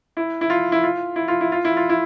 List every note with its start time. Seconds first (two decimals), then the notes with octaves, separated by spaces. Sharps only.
0.17 E4
0.41 E4
0.50 F4
0.72 E4
0.83 F4
1.16 E4
1.28 F4
1.41 E4
1.52 F4
1.65 E4
1.77 F4
1.89 E4